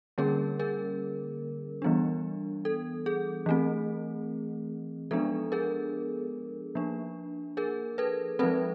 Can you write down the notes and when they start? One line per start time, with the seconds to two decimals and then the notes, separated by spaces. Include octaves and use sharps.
0.18 D3 G3 A#3 C#4 G#4 A#4
0.59 G#4 A#4
1.82 E3 G3 B3 D4
2.65 A4
3.06 G#4
3.46 E3 A3 C4
5.11 F3 G#3 B3 D4 A4
5.52 G#4 A#4
6.75 F3 A#3 D4
7.57 G#4 A#4
7.98 A4 B4
8.39 F3 G#3 C4 A4 B4